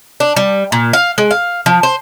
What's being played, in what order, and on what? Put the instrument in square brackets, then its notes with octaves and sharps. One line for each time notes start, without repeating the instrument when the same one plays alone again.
[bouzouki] D4
G3
A#2
F5
G#3
F5
F3
C5